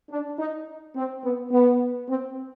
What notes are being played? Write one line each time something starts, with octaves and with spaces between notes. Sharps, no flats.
D4
D#4
C4
B3
B3
C4